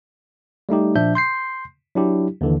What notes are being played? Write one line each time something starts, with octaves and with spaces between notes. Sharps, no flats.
G3 A3 D#4 G4
A#2 F3 D4 E5 G6
C6 G6 C7
F#3 D4 E4 G4
D#2 D3 E3